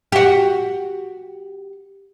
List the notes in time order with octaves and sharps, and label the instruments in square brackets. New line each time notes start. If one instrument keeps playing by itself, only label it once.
[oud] F#4 G4